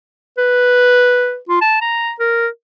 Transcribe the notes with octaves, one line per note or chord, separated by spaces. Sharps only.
B4
F4
A5
A#5
A#4